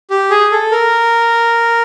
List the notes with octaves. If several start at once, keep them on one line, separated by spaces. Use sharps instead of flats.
G4
G#4
A4
A#4